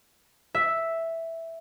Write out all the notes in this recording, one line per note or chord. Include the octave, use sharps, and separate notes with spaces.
E5